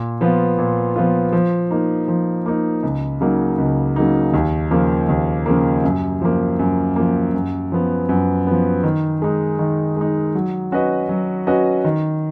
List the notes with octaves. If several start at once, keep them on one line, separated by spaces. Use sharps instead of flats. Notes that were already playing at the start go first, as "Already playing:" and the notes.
Already playing: A#2
F3 B3 F4
A#2
F3 B3 F4
F3
A#3 D#4
F3
A#3 D#4
C#2
C#3 F#3 A#3 D#4
C#2
C#3 F#3 A#3 D#4
D#2
C#3 F3 A#3
D#2
C#3 F3 A#3
F#2
F3 A#3
F#2
F3 A#3
F#2
F3 B3
F#2
F3 B3
D#3
G#3 D#4
D#3
G#3 D#4
F#3
C#4 F#4 B4 D#5
F#3
C#4 F#4 B4 D#5
D#3